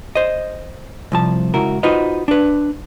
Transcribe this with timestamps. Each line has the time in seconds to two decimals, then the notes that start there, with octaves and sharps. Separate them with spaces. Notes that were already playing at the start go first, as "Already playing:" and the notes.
0.15 C5 D#5
1.12 C2 F3 A5
1.54 C#2 E4 F#4 A#4
1.83 D#4 F4 F#4 B4 C5 D#5
2.28 D4 B4